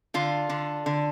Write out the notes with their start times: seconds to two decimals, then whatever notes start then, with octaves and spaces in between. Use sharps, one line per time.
0.14 D3 F4
0.49 D3
0.86 D3